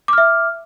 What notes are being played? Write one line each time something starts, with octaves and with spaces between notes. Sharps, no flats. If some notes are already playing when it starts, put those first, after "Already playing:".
E5 D6 F6